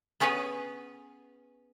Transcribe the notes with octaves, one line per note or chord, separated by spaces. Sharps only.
B3 C#4 G#4 B4 C#5